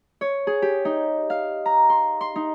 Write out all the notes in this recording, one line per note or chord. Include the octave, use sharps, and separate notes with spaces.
C#5
G#4
G4
D#4
F5
A#5
C6
C6
D#4